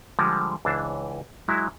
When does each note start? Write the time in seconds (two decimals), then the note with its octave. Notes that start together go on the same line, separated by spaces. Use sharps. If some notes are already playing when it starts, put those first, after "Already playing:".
0.19 D3 F3 G3 G#3
0.65 C#2 E3 D4 C5 A5
1.48 F#3 G#3 E4